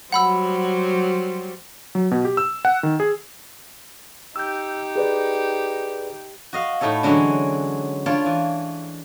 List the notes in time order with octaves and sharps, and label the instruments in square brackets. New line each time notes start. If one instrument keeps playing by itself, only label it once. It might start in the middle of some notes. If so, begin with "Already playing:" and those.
[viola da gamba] F#3 G3 C5 [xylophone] F#5 B5 E6
[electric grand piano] F#3
B2
G4
E6
F#5
D#3
G#4
[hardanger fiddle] D#4 G4 [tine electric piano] E6 G6
[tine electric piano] G#4 B4 D5
[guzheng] F#4 D#5 F5
A2 A3 D#4 A4 C#5
D3 E3 F#3 G#3 C#4 D4
D4 F4 C#5 D5
E3